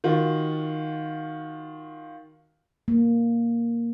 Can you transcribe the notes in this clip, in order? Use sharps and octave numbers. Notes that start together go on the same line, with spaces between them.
D#3 F4 F#4
A#3